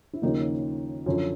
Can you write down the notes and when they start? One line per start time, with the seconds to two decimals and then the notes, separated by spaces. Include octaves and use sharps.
0.13 E4
0.22 D#2 C#3 F3 A#3 D#4
1.06 F#2 D3 F3 C#4